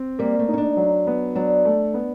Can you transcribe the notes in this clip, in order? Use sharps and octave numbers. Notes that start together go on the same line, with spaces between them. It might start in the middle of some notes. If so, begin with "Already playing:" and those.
Already playing: C4
G3 A#3
A3
C#4 D#4
D4
F#3
B3
F#3 D4
A3
B3